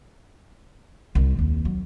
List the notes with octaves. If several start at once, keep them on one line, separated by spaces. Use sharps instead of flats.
C2
D#2
F#3